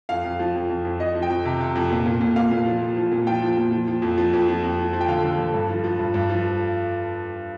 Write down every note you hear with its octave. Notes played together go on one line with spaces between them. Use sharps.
F2 F5
F2
F3
F2
F2
F2
F2 D#5
F3
G5
F2
C3
C3
F2
A#2
A#2
A#2
A#2 F5
A#2
F3
F3
F3
A#2
F3 G5
F3
A#2
F3
F3
F2
F3
F2
F3
F2
F3
F3
G5
D3 F5
D3
D3
G2
F3
F3
G2
G2
F3